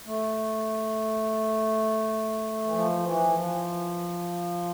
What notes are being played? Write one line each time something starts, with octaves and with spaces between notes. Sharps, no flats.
A3
E3
F3
E3
F3